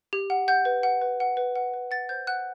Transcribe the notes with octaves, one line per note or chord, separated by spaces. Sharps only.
G4
F#5
F#5 G6
B4
F#5
B4
F#5
B4
F#5
B4
F#5 A6
C5 G6
F#5 F#6